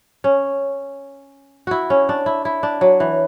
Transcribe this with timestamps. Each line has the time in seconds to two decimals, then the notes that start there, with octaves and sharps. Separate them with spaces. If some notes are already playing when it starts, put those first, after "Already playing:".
0.24 C#4
1.67 E4 F#4
1.90 C#4
2.09 D4
2.26 E4
2.45 E4
2.63 D4
2.81 F#3
3.00 E3